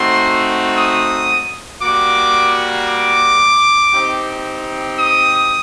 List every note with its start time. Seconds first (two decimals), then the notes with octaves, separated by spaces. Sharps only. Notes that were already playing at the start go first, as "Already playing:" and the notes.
Already playing: A3 C4 D#4 F#4 C6
0.77 D#6
1.82 G3 A#3 F#4 D6
2.88 D6
3.94 C4 D#4 G4
4.99 D#6